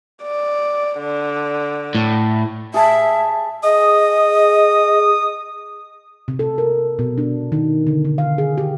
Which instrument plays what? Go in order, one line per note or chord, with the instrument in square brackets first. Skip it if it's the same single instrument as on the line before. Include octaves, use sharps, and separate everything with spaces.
[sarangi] D5
D3
[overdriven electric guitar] A2
[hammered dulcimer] G#4 A5 [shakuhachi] E5
[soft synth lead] G#4 [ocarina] D#5 [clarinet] D#6
[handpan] C3
A4
A#4
B2
D4
D#3
D3
D3
F5
G#4
G4